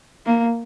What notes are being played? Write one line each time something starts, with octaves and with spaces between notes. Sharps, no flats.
A#3